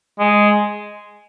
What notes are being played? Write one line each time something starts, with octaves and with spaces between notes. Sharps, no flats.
G#3